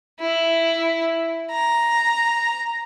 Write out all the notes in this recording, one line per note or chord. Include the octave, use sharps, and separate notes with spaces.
E4
A#5